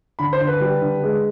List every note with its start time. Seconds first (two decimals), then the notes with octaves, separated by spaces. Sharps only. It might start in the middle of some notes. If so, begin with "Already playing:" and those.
0.19 D3 B5
0.33 C5
0.41 D3
0.48 B4
0.61 G3
0.82 D3
1.03 G#3